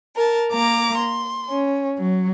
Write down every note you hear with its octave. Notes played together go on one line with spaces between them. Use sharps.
A#4 A5
A#3 A#5 D6
C6
C#4
F#3